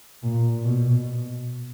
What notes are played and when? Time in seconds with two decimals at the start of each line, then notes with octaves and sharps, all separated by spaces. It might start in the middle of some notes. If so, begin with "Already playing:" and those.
0.23 A#2
0.64 B2